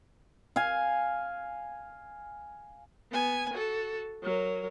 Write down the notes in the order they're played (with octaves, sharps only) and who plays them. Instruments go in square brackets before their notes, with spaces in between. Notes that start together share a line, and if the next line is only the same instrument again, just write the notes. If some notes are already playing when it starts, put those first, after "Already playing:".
[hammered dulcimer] F5 G#5
[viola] B3 G#5
F#4 A4
F#3 A#4